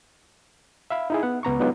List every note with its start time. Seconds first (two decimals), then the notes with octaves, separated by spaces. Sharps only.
0.90 E5 F5 B5
1.10 D#4 E4 G#4
1.23 B3 F#5
1.43 C#2 B3 A#5 C#6
1.60 F#3 G#3 B3 D4 D#4 F4